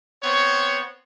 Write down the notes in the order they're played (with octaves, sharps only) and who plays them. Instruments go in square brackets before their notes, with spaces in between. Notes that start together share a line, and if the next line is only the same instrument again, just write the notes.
[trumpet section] B3 C4 C#5